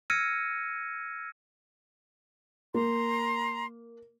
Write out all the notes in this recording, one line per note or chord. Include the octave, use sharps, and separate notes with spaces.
E6 F6 G#6 A#6 C#7 D#7
A#3 A#5 C6